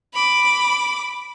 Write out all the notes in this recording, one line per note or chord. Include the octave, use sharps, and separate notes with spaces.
B5 D6